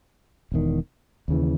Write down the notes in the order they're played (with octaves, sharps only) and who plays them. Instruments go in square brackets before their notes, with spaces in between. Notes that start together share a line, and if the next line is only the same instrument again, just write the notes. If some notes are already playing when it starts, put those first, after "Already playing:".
[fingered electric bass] E1 E2 D#3
D#2 C#3 E3